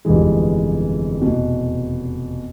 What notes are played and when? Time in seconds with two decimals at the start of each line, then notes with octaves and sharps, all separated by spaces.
0.05 G1 F2 C3 E3 G#3
1.22 F1 E2 B2